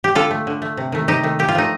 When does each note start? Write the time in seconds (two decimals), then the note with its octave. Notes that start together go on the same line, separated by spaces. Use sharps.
0.04 G4
0.15 D3 F4 A4
0.31 A3
0.47 D3
0.62 A3
0.77 C3
0.92 D#3 A3
1.08 C3 D#4 G4
1.23 D#3 A3
1.39 A#2 G4
1.49 F4
1.55 F3 A3 D#4